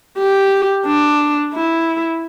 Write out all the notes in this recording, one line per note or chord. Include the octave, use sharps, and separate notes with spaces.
G4
D4
E4